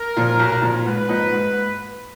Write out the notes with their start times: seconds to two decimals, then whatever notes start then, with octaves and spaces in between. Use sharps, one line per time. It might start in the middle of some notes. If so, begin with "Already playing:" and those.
Already playing: A#4
0.17 A#2 F3
0.39 B1
0.62 A#2 F3
0.85 G#2 B4
1.08 F3 A#3 D#4
1.32 G#2